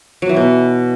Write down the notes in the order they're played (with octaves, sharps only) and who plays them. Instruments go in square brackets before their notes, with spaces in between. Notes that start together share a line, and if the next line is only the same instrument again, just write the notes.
[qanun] F#3
E3
B2